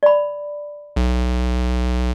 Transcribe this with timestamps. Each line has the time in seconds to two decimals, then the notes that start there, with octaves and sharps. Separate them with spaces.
0.03 D5 B5
0.96 B1